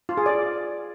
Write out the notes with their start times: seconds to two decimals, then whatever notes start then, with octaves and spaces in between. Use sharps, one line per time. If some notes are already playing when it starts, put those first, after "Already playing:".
0.09 F4
0.17 G#4
0.26 D5